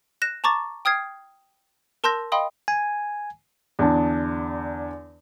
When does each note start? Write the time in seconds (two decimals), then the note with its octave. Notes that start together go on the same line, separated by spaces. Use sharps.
0.22 F#6 A#6 E7
0.44 A5 A#5 C#6 D6 A6
0.85 G5 D#6 F6 G#6 C7
2.04 A#4 A5 C6 E6 G6 A#6
2.32 D#5 F5 G5 B5 C6 D#6
2.68 G#5
3.79 E2 D3 D4 A5